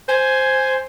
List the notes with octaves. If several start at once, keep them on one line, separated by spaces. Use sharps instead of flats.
C5 G#5